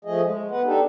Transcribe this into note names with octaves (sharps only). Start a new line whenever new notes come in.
F3 A3 G#4 D#5
G#3
B3 B4 F#5
D4 D#4 G4 A4